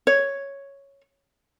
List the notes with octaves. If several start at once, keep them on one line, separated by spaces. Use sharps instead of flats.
C#5